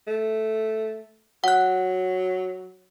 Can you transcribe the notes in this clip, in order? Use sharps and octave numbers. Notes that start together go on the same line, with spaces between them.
A3
F#3 F#5 F#6